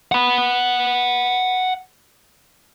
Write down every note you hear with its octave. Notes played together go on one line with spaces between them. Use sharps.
F#5 B5